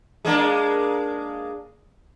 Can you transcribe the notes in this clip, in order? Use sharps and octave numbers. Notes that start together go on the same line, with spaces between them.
G#3 A#3 D4